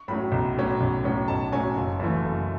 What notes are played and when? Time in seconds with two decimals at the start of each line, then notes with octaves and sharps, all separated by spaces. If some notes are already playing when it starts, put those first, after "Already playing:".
Already playing: C#6
0.08 A2 F#3 C#4 B5
0.32 B1
0.56 A2 F#3 C#4
0.81 B1
1.04 A2 F#3 C#4
1.28 B1 A5
1.52 A2 F#3 C#4 G#5
1.76 F#1
1.99 F#2 E3 A3
2.24 F#1